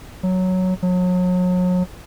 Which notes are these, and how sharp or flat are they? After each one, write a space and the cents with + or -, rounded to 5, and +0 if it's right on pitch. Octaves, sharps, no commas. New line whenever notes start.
F#3 +0
F#3 -35